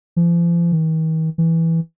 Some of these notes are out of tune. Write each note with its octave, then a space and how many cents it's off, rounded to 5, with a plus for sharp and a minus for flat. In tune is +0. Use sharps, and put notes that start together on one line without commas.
F3 -40
D#3 +45
E3 -5